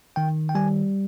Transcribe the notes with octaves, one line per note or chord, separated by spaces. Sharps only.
D#3 G5
G5
G3 G#5